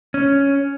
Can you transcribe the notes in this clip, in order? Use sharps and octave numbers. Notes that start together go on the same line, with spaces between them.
C#4